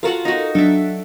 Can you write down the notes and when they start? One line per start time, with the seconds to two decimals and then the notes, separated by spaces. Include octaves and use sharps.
0.03 F4 F#4 A4 A#4 F#5
0.25 D#4 F#4
0.55 F#3 D4 A4 E5